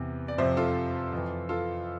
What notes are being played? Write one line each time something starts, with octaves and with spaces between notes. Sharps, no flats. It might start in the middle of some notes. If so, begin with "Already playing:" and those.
Already playing: E2 C3 E3
D5
F2 C3 F3 C5 E5
F4 A4
F2 E3
F4 A4